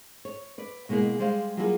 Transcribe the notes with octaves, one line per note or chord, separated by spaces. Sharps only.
C#5
B4 D5
B2 G#3 A#3 E4 G#4
G3 G#3 C5 D5 F5
F#3 G3 A#3 E4 F4 G#4